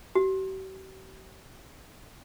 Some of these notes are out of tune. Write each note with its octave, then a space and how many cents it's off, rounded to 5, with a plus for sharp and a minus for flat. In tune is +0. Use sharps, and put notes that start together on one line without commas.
G4 -45